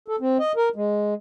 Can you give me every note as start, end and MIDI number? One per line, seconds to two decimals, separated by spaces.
0.08 0.16 69
0.20 0.38 60
0.40 0.52 75
0.56 0.69 70
0.76 1.14 56